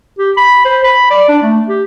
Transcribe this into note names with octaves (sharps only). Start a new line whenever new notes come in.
G4
B5
C5
B5
D5
D4
A3
G4